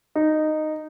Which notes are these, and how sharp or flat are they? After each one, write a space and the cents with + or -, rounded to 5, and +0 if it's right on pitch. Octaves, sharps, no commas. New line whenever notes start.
D#4 -10